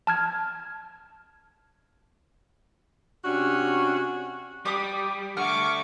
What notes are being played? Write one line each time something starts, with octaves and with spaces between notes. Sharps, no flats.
A5 F6 G#6
C3 C#4 D4 F#4
G3 G4 D6 D#6
D3 A3 F#5 C#6 D6 F6